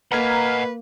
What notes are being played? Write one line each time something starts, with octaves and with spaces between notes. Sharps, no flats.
A#3 B4 D#5 F#5 A#5 F6 G#6